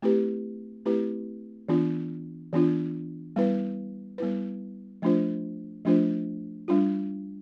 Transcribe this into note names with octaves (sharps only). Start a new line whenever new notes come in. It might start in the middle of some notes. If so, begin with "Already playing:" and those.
A3 C4 E4 G4 B4
A3 C4 E4 G4 B4
E3 B3 D4 F4
E3 B3 D4 F4
G3 B3 E4 B4
G3 B3 E4 B4
F3 A3 D4 F4 C5
F3 A3 D4 F4 C5
G3 D4 F4